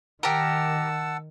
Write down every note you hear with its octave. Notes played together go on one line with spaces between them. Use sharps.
D#3 G4 A#4 F#5 A5 E6